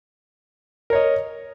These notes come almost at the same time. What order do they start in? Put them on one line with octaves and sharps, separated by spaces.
A#4 C#5 D#5